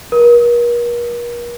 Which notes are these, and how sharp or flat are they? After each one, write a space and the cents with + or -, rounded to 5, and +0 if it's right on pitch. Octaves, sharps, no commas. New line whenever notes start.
A#4 +40